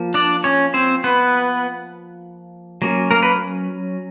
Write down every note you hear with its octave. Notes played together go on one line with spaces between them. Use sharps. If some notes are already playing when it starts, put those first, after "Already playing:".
Already playing: F3 A#3
D4 D5
C#4 C#5
C4 C5
B3 B4
F#3 A#3 C#4
A#3 A#4
B4